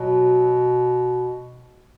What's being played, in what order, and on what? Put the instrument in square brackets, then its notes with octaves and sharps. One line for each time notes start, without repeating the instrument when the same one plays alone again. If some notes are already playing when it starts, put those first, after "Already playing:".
Already playing: [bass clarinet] B2 [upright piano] F#3